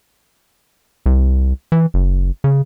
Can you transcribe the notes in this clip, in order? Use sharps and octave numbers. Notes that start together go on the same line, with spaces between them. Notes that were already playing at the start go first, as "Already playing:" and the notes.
C2
E3
F#1
C#3